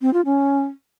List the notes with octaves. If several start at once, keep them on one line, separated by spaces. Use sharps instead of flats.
C4
F4
C#4